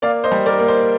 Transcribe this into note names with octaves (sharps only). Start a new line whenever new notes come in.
A#3 D5 F5
C5 D#5
G3
A#4 D5
A#3
C5 D#5